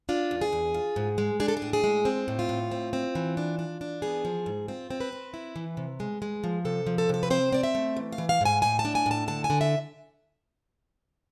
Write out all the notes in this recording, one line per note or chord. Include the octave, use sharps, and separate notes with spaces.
D4 F4
E2
G#4
E2
F4
G#2
G#3
D4 G#4
A4
G#4
A2
G#4
G#3
C4
A2
F4
A2
C4
C4
E3
D4
D4
D4
B3 G#4
F3
G#2
C4 F4
C4
B4
C4
E4
E3
C3
G#3
G#3
F3
C3 A4
F3
A4
C3 A4
B4
C4 C5
C4 D5
E5
A3
E3
F5
E3
F5
G#2 G#5
A2 G#5
A5
D4
G#5
A2 A5
D3 A5
G#5
D3
E5